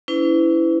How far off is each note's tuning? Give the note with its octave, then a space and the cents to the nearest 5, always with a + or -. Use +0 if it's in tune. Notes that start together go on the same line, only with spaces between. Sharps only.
C#4 +45 E4 +0 B4 +45